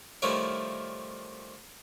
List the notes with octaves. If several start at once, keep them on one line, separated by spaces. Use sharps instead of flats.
D#3 F3 G3 A3 E4 C#5